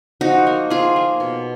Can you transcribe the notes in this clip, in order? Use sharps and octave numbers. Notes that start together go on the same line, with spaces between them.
F3 D#4 F#4
A#3
F3 F4 G#4
A#3
B2